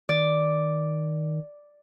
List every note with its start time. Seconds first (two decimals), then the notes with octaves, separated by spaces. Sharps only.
0.09 D#3 D5